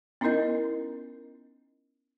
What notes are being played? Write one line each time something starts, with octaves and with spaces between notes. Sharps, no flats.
B3 C#4 D#4 E4 A#4 D#5